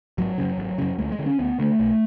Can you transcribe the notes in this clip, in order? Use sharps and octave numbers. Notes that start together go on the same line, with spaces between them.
G#1 F#3
F#2 C#3
G#1
F#2 C#3
D2 G#3
G#3
D3
C#4
D2 B3
D3 A3
B1